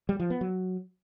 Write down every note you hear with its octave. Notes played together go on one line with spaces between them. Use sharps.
G3
F3
B3
F#3